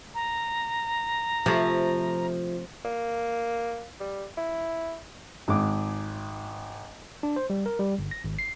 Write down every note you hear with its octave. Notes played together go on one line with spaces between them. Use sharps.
A#5
C3 F3 A3
A#3
G3
E4
G#1 G#3 D6
D4
C5
G3
A#4
G3
G1
A#6
G#1
C7